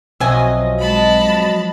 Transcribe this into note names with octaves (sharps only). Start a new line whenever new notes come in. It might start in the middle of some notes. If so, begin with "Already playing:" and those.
B1 F3 F#3 C4 D#5 E5 G#5
G#3 A5 B5